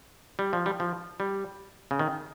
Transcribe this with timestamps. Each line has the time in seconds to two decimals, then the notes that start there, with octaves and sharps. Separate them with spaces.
0.39 G3
0.53 F3
0.66 G3
0.80 F3
1.20 G3
1.91 C#3
1.99 D#3